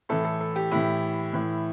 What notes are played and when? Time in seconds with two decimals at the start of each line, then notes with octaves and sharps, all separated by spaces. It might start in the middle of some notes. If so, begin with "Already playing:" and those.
0.09 A2 E3 A4
0.25 A4
0.41 A4
0.56 G4
0.71 A2 E3 E4
1.33 A2 E3